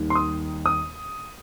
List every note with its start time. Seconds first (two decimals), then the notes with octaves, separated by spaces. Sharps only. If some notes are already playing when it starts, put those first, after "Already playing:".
Already playing: D#2 D#3 G3
0.10 C6
0.15 D#6
0.66 D#6